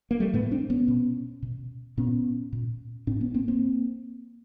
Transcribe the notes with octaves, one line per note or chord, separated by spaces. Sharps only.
A#3
G3 A3
A2 A3 B3
C4 D4
B3 C#4
B2
B2
A#2 B3 C#4
A#2
A2 C4 D4
B3 C#4
A#3 C4
A#3 C4